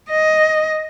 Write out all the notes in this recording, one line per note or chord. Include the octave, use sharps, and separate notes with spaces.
D#5